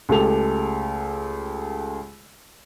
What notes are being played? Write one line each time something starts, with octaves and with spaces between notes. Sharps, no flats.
C#2 G#3 A3 G4 A4 F7